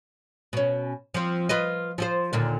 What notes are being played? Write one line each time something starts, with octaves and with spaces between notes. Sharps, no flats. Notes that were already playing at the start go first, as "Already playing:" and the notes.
B2 C#4
F3 C4
F4 B4 D#5
F3 F4 C5
D#2 A#2 D3